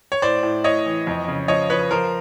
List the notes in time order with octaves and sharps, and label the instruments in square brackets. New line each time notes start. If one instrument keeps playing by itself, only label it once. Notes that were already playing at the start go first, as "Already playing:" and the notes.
[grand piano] C#5
A2 C5 D5
A2
A2 C#5 D#5
E3
F2
C#3
F3 C#5 D#5
F3 B4 C#5
F3 A#4 C5